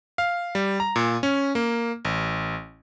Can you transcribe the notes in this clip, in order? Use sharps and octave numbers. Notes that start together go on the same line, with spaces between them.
F5
G3
A#5
A#2
C#4
A#3
A1